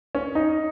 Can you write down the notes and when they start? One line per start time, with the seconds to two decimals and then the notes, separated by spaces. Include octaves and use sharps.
0.15 C#4
0.35 D#4